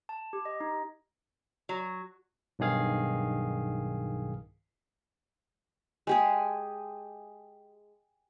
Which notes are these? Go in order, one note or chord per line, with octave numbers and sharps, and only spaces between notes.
A5
G4
D#5
D#4
F#3
B1 G2 D#3 G#4 F5
G#3 G4 G#4